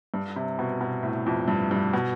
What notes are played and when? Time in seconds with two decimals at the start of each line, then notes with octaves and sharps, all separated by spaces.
0.14 G2
0.36 C3
0.59 B2
0.81 B2
1.03 A2
1.26 F2
1.48 G2
1.71 G2
1.93 B2